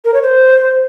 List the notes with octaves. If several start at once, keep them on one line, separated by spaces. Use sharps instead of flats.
A#4
C#5
C5